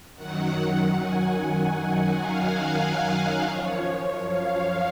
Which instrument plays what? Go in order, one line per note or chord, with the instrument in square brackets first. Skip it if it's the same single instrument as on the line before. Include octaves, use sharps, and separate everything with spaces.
[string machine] F#2 D#3 F#3 F#5
G#5
G#5
F5
F5
F#2 F3 C#5
F5